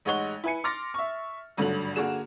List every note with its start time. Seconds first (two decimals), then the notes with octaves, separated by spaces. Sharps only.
0.05 A1 G#3 D#4 C#5 F#5 G7
0.44 E4 B4 G#5 C#7
0.64 C6 D6 F6 A6 A#6
0.94 E5 C#6
1.57 G#1 G2 D3 F#3 A3 F#7
1.96 D3 A#3 F#4 G#4 E7